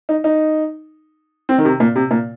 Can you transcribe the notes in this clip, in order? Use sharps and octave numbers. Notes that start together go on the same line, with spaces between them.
D#4
D#4
C4
D#3
C3
A#2
C3
A#2